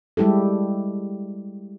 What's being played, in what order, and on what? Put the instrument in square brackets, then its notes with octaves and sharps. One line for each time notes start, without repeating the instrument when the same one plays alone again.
[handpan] G3 G#3 E4 G4 A4